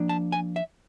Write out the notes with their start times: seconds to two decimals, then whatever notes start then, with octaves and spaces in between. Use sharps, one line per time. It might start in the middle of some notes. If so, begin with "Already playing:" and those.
Already playing: F3 A#3 D4
0.09 A5
0.32 G#5
0.56 E5